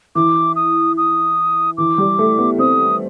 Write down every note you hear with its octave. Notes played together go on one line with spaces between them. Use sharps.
E3 D6
D#6
D#6
E3 D6
G3
A3
B3
C4 D#6